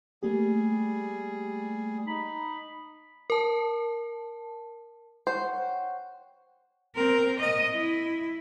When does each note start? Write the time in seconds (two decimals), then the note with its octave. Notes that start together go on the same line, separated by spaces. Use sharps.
0.23 G3 A3 A#3 G4 G#4
2.06 D#4 B5
3.30 A#4 A5
5.27 C5 C#5 F#5 G5
6.95 C4 A#4
7.40 D#5
7.72 E4